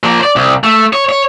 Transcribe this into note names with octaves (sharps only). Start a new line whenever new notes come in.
F3 A#3
C5 D5
C2
A3
C#5
C#5